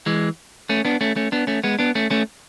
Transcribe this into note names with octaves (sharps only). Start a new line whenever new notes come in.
E3 G#3
A3 C#4
B3 D4
A3 C#4
A3 C#4
B3 D4
A3 C#4
G#3 B3
B3 D4
A3 C#4
A3 C#4